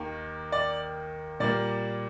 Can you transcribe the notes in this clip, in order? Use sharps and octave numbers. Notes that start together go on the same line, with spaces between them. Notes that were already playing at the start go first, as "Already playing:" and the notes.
Already playing: D#2 D#3 A#3
D5
A#2 G3 A#3 D5